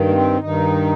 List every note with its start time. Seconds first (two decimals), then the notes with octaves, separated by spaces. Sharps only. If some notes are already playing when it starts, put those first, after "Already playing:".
Already playing: G2 D#3
0.08 A#3
0.13 C4
0.40 G2 D#3 D#4